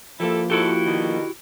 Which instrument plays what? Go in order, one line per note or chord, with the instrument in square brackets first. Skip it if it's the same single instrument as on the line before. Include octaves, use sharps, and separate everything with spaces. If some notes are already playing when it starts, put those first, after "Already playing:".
[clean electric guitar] F3 A#3 [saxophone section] E4 G4 A4
[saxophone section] G#2 A4 [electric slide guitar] E4 F#4 G4
[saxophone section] B2 D3 D#3